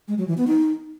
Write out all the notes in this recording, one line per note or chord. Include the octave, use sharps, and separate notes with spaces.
G#3
F#3
E3
B3
D#4